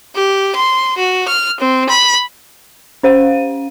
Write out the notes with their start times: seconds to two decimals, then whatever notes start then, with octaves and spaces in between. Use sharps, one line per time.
0.16 G4
0.55 C6
0.97 F#4
1.28 F6
1.60 C4
1.89 B5
3.03 C#4 C5 F5 D#7